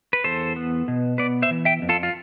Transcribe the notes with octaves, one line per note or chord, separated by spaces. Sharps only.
B4
E2 A4 C5
B3
B2
B3 B4 D5
C5 E5
E3
E5 G5
F2
F4 A4
F4